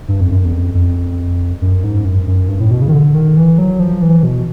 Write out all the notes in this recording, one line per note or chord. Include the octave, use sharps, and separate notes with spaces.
G2
F2
F#2
E2
F2
F2
F#2
G#2
F#2
F#2
G2
A2
B2
C#3
D#3
D3
D#3
E3
F#3
F3
E3
B2